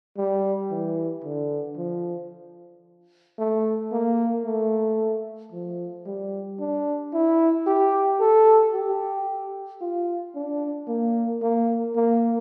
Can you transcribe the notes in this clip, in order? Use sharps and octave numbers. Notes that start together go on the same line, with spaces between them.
G3
E3
D3
F3
A3
A#3
A3
F3
G3
D4
E4
G4
A4
G4
F4
D4
A#3
A#3
A#3